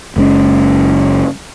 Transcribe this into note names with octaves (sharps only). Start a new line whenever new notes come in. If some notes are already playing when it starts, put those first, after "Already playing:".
F#1 G#3 C4 C#4